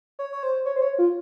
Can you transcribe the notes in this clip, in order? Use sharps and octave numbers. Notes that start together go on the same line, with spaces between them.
C#5
C#5
C5
C#5
C5
C#5
F4